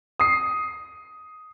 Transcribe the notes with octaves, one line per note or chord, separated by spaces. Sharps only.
D#6 C7